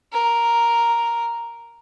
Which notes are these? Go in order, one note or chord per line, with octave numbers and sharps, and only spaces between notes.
A#4